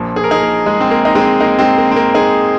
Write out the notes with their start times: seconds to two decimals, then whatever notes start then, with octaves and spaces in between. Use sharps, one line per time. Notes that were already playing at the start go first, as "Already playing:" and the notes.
Already playing: A#1 A#2 F3
0.16 G#4
0.24 A#4
0.31 D#4 G#4
0.41 A#3
0.66 G#3
0.81 C4
0.91 A#3
1.05 D#4
1.15 G#3 C4
1.40 A#3 D#4
1.59 G#3 C4
1.78 A#3
1.91 C4
1.96 A#3
2.14 D#4 G#4